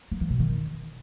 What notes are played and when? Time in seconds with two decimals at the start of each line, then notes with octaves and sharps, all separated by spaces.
0.12 A#3
0.21 E3
0.30 B2
0.39 D#3